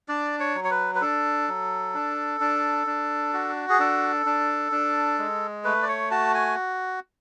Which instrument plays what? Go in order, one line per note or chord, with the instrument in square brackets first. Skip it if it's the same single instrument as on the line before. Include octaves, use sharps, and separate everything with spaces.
[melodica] D4 D5
C#5
F#3
C#5
B4
B4
D4 A4
F#3
D4
D4
D4
F#4
G#4
D4 A4
D4
D4
G#3
A3 B4
D5
C#5
F#4 A5
G#5